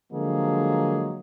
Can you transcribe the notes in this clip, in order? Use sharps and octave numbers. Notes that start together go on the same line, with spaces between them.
D3 F3 F#3 G#3 A#3 G#4